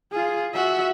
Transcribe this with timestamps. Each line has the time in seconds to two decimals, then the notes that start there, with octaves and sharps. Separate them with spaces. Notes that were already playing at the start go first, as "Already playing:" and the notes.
0.12 F4 G#4
0.54 F#4 E5